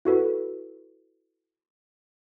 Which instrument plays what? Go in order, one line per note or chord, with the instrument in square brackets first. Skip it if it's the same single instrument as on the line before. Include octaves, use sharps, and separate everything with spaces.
[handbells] E4 F#4 A4 B4